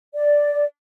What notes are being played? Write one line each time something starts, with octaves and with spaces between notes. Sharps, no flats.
D5